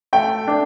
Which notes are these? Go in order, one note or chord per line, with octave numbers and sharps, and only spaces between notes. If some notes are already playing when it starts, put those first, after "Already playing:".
A3 G5
D4